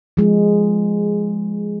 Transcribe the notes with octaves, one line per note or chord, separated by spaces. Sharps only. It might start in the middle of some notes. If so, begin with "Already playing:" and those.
F3 G#3